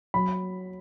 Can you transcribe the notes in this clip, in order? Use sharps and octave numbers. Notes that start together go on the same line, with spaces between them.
F#3 B5